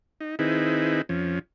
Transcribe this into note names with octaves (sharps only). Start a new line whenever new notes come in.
D#4
D#3 C4 D#4 E4 G#4 B4
F2 F3 C#4